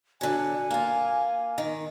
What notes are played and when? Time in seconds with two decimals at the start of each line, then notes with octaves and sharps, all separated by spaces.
0.21 D3 F#3 G#5
0.71 A#3 F4
1.58 D#3